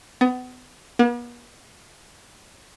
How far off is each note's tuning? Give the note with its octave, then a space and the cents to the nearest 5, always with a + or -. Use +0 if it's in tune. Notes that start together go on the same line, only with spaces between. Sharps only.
B3 +30
B3 -45